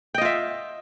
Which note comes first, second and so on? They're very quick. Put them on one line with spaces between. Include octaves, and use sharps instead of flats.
G5 D#5 F4 E5